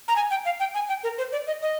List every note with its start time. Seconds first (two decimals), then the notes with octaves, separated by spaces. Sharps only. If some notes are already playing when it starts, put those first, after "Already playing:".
0.08 A#5
0.16 G#5
0.30 G5
0.45 F5
0.60 G5
0.74 G#5
0.89 G5
1.03 A#4
1.18 C5
1.32 D5
1.47 D#5
1.62 D#5